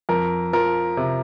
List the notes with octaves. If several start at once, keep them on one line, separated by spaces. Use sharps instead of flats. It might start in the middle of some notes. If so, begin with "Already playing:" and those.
F2 A#4
F3 A#4
C3